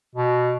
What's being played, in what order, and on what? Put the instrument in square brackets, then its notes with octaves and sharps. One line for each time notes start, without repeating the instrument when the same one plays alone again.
[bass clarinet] B2